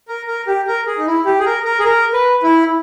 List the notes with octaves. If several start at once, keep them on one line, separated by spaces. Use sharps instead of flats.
A#4
A#4
G4
A#4
G#4
D#4
E4
G4
G#4
A#4
A#4
G#4
A#4
B4
E4